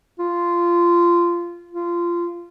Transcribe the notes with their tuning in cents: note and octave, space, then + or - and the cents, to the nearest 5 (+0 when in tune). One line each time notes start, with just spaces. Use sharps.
F4 -15
F4 -20